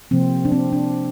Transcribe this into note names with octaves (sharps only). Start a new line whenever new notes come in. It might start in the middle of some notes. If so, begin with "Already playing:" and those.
C3 F3 A#3 C4
D4
C4
D4